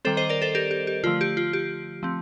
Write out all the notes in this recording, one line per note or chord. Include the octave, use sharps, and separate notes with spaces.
D#3 G3 C4 A4 C5
C5 D#5
A#4 D5
A4 C5
G4 A#4
G4
G4
D3 F3 A3 F4
G4
F4
G4
F3 A3 C4